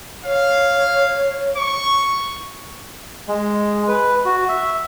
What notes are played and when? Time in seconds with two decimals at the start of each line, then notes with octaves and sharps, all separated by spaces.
0.25 C#5 F5
1.57 C#6
3.28 G#3
3.88 B4
4.25 F#4
4.49 E5